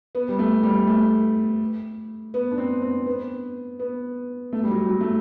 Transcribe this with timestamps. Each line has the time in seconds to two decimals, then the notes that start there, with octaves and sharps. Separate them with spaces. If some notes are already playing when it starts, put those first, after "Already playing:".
0.15 B3
0.29 G3
0.39 A3
0.63 G3
0.87 A3
2.34 B3
2.51 D4
2.58 C4
2.82 C4
3.06 B3
3.79 B3
4.53 A3
4.63 G3
4.71 F#3
4.89 F#3
5.01 A3